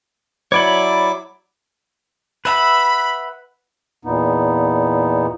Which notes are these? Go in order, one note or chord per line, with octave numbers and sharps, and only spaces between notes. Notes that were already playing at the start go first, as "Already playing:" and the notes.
F#3 E4 C#5 D5 B5 D6
B4 E5 F#5 B5
E2 A#2 B3 D#4